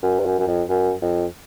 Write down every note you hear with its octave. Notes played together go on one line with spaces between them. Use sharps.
F#2
G2
F#2
F#2
F2
F#2
F2